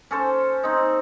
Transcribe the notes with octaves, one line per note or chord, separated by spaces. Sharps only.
C#4 A4 C5
C4 D#4